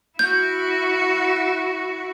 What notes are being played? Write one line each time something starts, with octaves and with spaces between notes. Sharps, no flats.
E4 F#4 G6